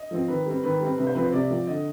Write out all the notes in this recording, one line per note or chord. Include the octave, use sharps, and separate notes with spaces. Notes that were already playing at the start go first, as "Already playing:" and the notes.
Already playing: D#5
F3 C4
D#3 B4
G3 C4
D#3 B4
G3 C4
C3 B4
C5
F3 C4 B4
C5
C3 D5
F3 C4
D3 D#5